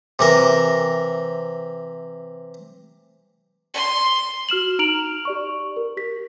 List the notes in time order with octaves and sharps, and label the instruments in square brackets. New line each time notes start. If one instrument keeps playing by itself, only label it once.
[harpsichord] C3 E3 A#4
[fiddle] C6
[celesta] F#4 F6 E7 F#7
D#4 A#5 F6 D7 F7 F#7
G4 D5 C#6
A#4
G4 B6